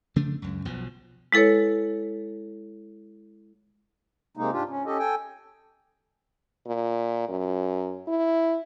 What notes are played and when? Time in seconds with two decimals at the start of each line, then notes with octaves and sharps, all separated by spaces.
0.16 C#3 F3 A3 D4
0.42 C#2 F#2
0.65 B1 B2 F3
1.32 G#3 E4 A4 B4 C#5
4.37 C3 G#3 A#3 D#4
4.53 G#2 D4 F4 G4
4.69 C#4
4.86 C#4 G4 A4 D#5
4.99 A4 G5 G#5
6.67 A#2
7.29 F#2
8.08 E4